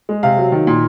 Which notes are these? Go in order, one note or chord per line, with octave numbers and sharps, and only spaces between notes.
G#3
C3 F5
F#3
D#3
A#2